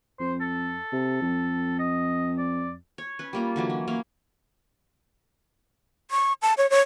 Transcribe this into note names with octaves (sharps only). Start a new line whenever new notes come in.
F2 C5
A4
C3
F2
D#5
D5
C#5
C#4 B4
G3 A#3 F4
D3 E3 F#3
C#4
A#3 C#4 F5
C#6
A5
C#5
C#5